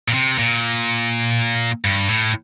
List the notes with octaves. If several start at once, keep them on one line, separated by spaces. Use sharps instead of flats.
A#2
C3
A#2
G2
A2